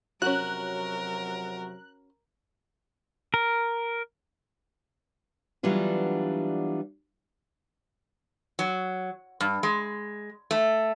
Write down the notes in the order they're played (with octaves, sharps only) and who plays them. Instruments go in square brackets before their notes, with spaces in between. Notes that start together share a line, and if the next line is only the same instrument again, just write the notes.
[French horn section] F2 C3 F#3 [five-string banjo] C#4 F#4 [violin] A#4 [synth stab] F#6
[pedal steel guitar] A#4
[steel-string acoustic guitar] E3 F#3 G3 B3 D4 F4
[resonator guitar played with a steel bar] F#3
G2
G#3
A3